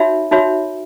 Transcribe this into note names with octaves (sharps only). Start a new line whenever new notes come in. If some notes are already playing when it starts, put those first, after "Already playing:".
Already playing: D#4 F#4 C#5 E5 B5
D#4 F#4 C#5 E5 B5